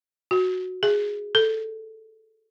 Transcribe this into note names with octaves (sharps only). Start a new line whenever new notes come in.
F#4
G#4
A4